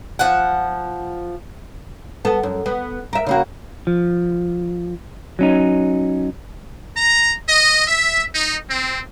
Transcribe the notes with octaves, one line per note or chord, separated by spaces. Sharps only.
F3 F#5
B3 A4
F#2
B3
A#4 E5
C#3 A#3 F#4
F3
F#3 C#4 D#4
A#5
D#5
E5
D#4
C4